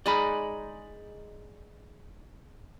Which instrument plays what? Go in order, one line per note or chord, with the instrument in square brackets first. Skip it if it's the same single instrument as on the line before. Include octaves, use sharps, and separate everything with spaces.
[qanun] G#3 D#4 D#5 [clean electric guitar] D5 G#5 B5